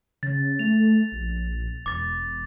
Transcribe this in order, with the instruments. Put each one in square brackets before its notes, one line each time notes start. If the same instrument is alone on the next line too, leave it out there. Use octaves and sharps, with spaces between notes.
[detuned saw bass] C#3 [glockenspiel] A6
[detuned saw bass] A3 [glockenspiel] F7
[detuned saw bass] A#1
[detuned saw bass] E1 [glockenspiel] D6 A6